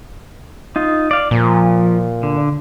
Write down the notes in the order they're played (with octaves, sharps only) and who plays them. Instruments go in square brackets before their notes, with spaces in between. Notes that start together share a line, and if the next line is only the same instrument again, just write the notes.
[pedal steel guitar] D#4 F4
D5 F5
[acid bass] A#2 [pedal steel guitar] F3
[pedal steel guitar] D3